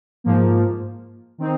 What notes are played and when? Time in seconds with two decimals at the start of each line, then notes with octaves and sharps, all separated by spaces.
0.24 G#2 F3 A#3
1.38 D#3 C4 D#4